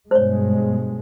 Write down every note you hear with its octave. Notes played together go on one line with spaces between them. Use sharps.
G2 B2 G#3 C5 C#5